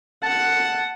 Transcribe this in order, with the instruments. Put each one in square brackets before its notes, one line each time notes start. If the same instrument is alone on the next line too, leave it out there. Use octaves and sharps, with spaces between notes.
[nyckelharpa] F#5 [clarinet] A5